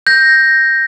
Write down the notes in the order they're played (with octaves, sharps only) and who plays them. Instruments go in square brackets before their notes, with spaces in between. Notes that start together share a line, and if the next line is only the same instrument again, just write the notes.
[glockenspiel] G6 A#6